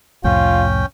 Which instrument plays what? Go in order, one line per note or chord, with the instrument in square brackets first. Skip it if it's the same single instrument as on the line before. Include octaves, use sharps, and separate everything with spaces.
[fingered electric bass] C2 F2 A2 [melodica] C#4 G5 [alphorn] F4